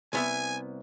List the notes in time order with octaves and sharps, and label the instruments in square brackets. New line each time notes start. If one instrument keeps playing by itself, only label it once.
[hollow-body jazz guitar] C2 B3 E5 [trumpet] G#5